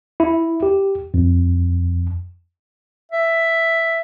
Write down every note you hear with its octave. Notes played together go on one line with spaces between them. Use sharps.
E4
G4
F2
E5